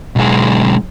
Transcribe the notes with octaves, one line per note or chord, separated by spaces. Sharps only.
B1 G#3